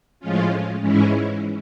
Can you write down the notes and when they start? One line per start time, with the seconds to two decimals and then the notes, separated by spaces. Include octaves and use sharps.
0.20 A2 F3 G#3 C#4 F4
0.81 G#2 E3 G#3 C#4 E4